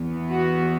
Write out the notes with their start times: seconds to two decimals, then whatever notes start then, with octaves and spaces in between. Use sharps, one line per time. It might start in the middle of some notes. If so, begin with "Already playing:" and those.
Already playing: E2 E3 B3
0.30 F#4